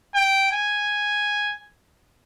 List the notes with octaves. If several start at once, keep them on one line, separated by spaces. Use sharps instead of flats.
G5
G#5